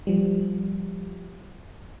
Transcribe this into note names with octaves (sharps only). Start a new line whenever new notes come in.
F3 G3